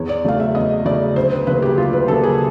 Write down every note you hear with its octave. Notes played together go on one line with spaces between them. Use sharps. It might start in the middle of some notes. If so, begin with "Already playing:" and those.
Already playing: E2 C#5
D5
C#3 F#3 A3 F5
E5
E2 D#5
C#3 F#3 A3 D5
D2 C5
B4
C#3 F#3 A#3 B4
G4
D2 F4
B4
C#3 F#3 A#3 A4
G#4